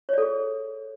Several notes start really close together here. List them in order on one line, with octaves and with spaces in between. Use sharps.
C#5 D5 A4 G#4